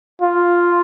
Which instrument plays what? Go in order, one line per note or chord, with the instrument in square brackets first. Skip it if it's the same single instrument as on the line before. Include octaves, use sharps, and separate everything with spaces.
[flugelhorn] F4